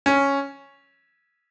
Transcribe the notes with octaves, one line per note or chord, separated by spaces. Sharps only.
C#4